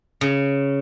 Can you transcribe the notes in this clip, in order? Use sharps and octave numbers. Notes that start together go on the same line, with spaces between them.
C#3